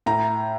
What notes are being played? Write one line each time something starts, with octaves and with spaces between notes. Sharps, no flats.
A2 A#5